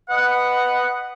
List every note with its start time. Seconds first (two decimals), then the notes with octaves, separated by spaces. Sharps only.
0.10 B4 D#5 F#5